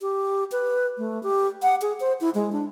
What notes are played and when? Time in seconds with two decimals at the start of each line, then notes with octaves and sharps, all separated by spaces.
0.02 G4
0.52 B4
0.98 A3
1.23 G4
1.62 F#5
1.82 G#4
2.00 C5
2.21 E4
2.35 G#3
2.52 D4